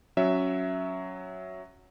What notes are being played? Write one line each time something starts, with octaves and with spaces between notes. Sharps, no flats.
F#3 C#4 E5